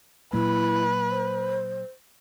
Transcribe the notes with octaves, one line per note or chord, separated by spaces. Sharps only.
A#2 F#3 A#3 E4 B4
C5